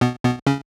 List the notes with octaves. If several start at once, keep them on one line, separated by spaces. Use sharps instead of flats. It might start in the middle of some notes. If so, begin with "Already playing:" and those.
B2 B3
B2 B3
C#3 C#4